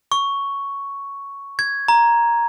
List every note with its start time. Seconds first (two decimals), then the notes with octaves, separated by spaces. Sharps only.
0.12 C#6
1.59 G#6
1.88 A#5